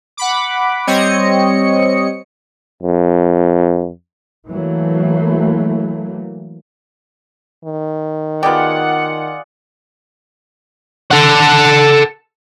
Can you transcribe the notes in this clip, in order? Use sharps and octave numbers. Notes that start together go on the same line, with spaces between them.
F#5 B5 D6
G3 C4 C#5 D#5 C#7
F2
E3 F#3 A3 A#3
D#3
B3 F4 G4 G#4 D5 F#5
A4 F#5